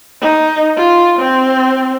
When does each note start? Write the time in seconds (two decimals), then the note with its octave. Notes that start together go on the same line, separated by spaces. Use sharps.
0.22 D#4
0.77 F4
1.20 C4